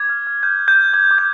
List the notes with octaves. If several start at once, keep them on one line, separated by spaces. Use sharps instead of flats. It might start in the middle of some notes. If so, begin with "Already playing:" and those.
Already playing: D6 G#6
F6
F6
F6 G6
F6
G6
F6
D6 G#6
D6
G6